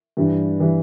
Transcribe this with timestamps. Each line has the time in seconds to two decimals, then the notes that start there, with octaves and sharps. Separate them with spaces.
0.17 G2 E3 G3
0.60 E3 G3